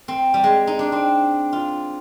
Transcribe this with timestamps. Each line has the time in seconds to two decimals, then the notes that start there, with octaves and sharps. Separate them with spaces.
0.08 C4
0.34 G3
0.44 G#3
0.67 D#4
0.79 D4
0.92 C4
1.53 F4